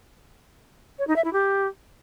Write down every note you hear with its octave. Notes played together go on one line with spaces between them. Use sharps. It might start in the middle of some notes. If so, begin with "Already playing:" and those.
C#5
D#4
E5
E4
G4